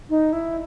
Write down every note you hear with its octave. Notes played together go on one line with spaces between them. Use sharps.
D#4
E4